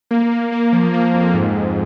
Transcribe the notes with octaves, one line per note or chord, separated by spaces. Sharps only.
A#3
A#3
A#3
F3
A#3
F2
G#2
G#2